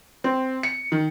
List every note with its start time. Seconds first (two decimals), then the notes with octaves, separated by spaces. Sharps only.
0.24 C4
0.63 C#7
0.92 D#3